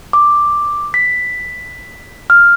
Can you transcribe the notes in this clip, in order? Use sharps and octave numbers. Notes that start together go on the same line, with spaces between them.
D6
B6
F6